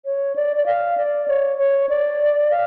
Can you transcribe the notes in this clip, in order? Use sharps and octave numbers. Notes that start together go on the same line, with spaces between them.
C#5
D5
D5
F5
D5
C#5
C#5
D5
F5